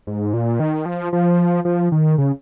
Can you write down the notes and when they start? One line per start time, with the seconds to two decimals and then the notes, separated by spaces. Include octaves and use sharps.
0.07 G#2
0.34 A#2
0.60 D#3
0.86 F3
1.13 F3
1.65 F3
1.92 D#3
2.18 C#3